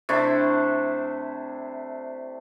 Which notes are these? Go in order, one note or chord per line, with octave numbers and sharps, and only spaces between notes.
C3 A3 D4 E4